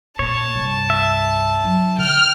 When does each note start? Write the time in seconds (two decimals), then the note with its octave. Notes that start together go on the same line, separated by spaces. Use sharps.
0.19 A#2 C#5 A5
0.54 C2 G2
0.90 E5
1.63 F#3 D#4
1.98 D3 G5 F6